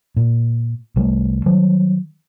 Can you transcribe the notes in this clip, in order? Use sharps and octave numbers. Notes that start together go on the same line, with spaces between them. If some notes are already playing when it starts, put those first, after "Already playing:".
A#2
C2 G3 A3
D#3 F#3 G3